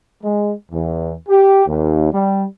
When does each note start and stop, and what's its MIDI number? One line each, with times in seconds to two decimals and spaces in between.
0.23 0.52 56
0.71 1.12 40
1.29 1.64 67
1.66 2.10 39
2.12 2.44 55